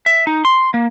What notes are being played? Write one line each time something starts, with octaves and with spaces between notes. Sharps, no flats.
E5
D#4
C6
A#3